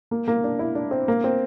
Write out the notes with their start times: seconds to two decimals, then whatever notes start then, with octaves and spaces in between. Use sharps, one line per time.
0.11 A#3
0.28 A#3
0.44 D4
0.59 E4
0.75 D4
0.91 C4
1.08 A#3
1.24 C4